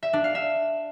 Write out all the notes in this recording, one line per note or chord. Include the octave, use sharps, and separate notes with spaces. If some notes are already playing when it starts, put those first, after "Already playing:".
E5
D4
F5
E5